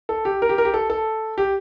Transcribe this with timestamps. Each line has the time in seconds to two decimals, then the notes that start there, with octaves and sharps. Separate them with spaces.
0.09 A4
0.25 G4
0.42 A#4
0.49 G4
0.58 A#4
0.65 G4
0.74 A4
0.90 A4
1.38 G4